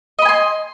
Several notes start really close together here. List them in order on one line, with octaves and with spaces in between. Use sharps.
D#5 B5 G#5 C6